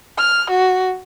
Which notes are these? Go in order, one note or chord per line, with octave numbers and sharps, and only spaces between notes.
F6
F#4